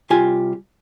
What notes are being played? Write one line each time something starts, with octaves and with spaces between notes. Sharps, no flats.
C2 F4 G4 G#5